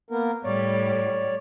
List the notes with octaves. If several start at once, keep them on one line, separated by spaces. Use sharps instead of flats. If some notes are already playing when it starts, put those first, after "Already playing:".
A#3 B3 A#4
A2 G3 C#5 D5